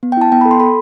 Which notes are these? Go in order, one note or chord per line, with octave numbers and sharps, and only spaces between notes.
B3
G5
E4 A5
B3 G5
B5
A4
C6
A4 B5